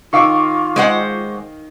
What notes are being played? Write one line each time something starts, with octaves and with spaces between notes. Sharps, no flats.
D#3 F4 F5 C#6 D6 E6
G#3 C5 F#5